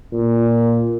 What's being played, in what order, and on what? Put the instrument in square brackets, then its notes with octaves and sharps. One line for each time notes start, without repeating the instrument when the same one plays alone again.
[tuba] A#2